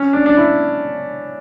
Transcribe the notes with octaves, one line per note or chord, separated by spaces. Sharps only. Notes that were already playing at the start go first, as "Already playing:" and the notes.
Already playing: C#4
D4
D4
E4